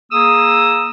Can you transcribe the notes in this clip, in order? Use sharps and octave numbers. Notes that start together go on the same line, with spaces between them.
A#3 G#4 D#6 E6